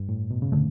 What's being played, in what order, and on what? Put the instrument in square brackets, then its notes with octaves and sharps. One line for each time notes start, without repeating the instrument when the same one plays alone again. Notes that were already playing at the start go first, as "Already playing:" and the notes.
Already playing: [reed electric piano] G2
A2
B2
C#3
[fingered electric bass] D3 A3